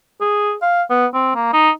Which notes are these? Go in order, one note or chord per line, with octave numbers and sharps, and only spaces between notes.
G#4
F5
B3
C4
A#3
D#4